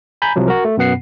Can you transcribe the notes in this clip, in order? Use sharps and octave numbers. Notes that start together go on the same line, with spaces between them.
G#5 A#5 B5 G6
C2 C3 F3 F#3
F#4 A#4
A3
F#2 B2 B3 F#5 C7